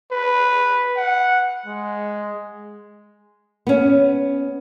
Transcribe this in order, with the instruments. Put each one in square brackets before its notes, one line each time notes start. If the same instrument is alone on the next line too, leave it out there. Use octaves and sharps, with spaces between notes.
[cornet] B4
F#5
G#3
[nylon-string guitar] B3 C#4